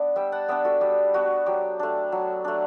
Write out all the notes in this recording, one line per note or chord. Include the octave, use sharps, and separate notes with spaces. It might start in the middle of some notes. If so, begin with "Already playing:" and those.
Already playing: B3 D4 D5
G3 E5 G5
F#5 A5
B3 D4 E5 G5
F#4 A4
G3 G4
B3 D4 F#4
F#3 G4
A3 D4
F#3
A3 D4